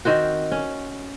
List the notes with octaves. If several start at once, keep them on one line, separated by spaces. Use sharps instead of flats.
D#3 C4 F#4
C#4